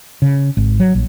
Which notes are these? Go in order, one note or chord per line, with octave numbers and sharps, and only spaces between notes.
C#3
G#1
F#3
A#1